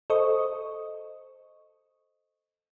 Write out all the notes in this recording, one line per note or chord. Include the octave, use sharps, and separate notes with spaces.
A4 C5 D#5 C#6 D#6